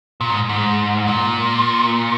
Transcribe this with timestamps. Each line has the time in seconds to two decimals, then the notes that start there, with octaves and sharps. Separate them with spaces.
0.21 A#2
0.30 G#2
0.49 G#2
1.07 A#2